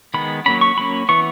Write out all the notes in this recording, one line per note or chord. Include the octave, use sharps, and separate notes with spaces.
D#3 G#3 B3 B5
F#3 A#3 C#4 B5
C#6
F#3 A#3 C#4 B5
E3 B3 C#6